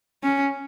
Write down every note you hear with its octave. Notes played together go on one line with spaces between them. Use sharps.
C#4